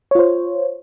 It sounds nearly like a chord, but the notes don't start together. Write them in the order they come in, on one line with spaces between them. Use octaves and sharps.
C#5 F4 C5